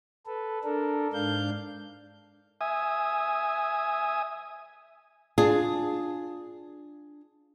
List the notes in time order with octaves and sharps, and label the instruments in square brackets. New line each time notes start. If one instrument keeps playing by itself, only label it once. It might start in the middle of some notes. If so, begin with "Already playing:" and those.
[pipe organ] A4 B4
D4 A4 A#4
G#2 D4 F5 G6
[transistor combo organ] E5 G#5 D#6
[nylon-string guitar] D4 F4 G#4